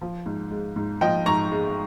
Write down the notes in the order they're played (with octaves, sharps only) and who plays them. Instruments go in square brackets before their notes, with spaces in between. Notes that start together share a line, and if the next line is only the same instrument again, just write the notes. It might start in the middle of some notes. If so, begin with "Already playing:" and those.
[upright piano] F3
G#2
G#3
G#2
F3 D#5 G5
G#2 A#5 C#6
G#3